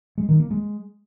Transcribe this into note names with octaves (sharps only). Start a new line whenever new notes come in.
G#3
D#3
A#3
G#3